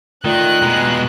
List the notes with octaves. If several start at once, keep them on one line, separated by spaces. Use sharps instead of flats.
D#3 A3 F4 D5 F#6
B2 G#3 A#5